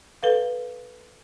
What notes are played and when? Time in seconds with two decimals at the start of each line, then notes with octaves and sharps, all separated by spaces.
0.23 A4 B4 F5